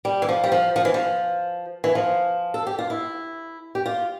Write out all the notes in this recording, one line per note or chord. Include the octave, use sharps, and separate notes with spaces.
G3
E3
F3
G3
F3
F3
E3
F3
E3
F3
A4
G4
F4
E4
G4
F4